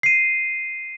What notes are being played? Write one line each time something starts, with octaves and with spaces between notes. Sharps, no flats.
C7 D#7